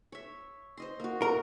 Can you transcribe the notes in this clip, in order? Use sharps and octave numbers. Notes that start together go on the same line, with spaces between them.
C#5 E5
C5 D#5 C6
A#3 F#4
A#4